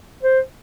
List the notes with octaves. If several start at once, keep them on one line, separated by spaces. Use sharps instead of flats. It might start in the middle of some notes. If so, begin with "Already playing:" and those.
C5